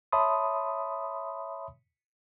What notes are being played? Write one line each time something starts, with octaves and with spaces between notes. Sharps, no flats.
C#5 E5 A5 B5 C6 D#6